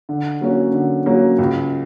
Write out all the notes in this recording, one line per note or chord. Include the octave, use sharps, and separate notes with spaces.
D3
F#3 A#3 C#4 F#4
D3
F#3 A#3 C#4 F#4
C#2